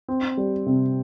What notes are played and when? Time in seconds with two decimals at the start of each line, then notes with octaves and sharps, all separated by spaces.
0.08 C4
0.37 G3
0.66 C3